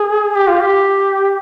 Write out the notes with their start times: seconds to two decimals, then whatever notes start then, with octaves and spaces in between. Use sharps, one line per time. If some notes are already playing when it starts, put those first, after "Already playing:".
Already playing: G#4
0.35 G4
0.48 F4
0.60 G4